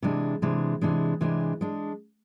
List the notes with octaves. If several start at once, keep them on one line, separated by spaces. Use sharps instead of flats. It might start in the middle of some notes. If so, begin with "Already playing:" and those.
C3 E3 G#3 D4
C3 E3 G#3 D4
C3 E3 G#3 D4
C3 E3 G#3 D4
G#3 D4